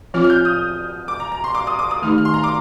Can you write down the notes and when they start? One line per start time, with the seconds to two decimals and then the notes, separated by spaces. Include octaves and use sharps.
0.14 F3 C4 F4 F6
0.24 F6
0.30 G6
0.45 D#6
1.08 D6
1.20 A#5
1.32 A#5
1.44 C6
1.55 D6
1.67 D#6
1.79 D6
1.91 D#6
2.02 D#3 A3 D#4 G4 F6
2.18 F6
2.25 C6
2.34 A#5
2.44 D6